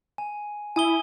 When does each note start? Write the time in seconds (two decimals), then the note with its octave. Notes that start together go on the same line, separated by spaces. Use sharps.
0.18 G#5
0.76 E4 G#5 D#6 G7